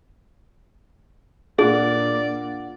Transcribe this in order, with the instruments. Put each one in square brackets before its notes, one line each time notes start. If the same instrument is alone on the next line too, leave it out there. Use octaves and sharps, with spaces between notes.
[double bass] A#2 A#3 [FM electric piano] D4 F4 F#5 [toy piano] G#4 [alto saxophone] D5